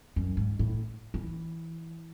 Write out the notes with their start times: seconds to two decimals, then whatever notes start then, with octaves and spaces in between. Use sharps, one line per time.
0.16 F#2
0.37 G#2
0.59 A2
1.14 E3